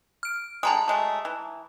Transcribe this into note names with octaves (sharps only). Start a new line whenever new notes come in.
F6 D7
D3 G3 G#3 A5 A#5 D#6
F#3 G#3 A3
E3